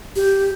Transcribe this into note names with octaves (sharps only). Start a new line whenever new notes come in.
G4